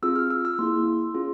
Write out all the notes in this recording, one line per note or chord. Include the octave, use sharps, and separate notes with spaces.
C4 F4 G#4 E6
F6
E6
E6
A#3 E4 G#4 C6
C#4 F4 G#4